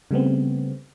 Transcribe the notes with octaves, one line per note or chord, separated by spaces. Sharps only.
C#3 G3 A3 B3 C4